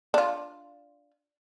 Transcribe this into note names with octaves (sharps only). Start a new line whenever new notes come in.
D4 F4